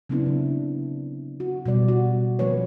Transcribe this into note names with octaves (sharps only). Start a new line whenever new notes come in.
C#3 F#3 B3 C4 D4 E4
C#3
F#4
B2 G3 D5
F#4
F3 A#3 B4 C#5